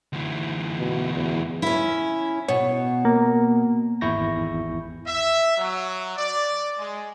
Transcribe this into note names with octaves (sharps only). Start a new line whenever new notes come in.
D2 E3
B2
E2
C#4 E4
B2 C#5
A#3
G#1 E2 E4 C#6 G6 A#6
E5
F#3
D5
G#3